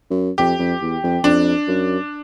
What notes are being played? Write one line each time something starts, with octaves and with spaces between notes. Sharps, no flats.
F#2
F2 G4
F2
E2
F2
F2 D4
F#2